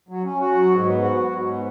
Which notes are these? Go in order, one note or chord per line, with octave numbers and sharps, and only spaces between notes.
F#3
C#4
F#4
F#3
G#2
B3
F#4
F#3
G#2
B3